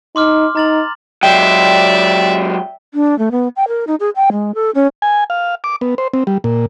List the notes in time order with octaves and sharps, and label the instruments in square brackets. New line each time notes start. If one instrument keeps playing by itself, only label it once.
[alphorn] D#4 [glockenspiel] C6 D6 F6
[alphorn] D#4 [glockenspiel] A#5 A6 F#7
[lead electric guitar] F#3 G#3 [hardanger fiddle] D5 E5 [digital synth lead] G5
[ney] D4
A3
B3
G5
A#4
D#4
G#4
G5
G#3
A4
C#4
[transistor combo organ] G#5
F5
D6
B3
C5
C4
G3
A#2